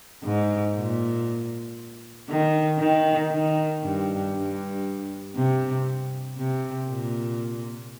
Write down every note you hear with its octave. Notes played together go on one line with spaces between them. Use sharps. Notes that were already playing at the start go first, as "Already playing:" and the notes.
G#2
A#2
D#3
D#3
D#3
G2
G2
C3
C3
A#2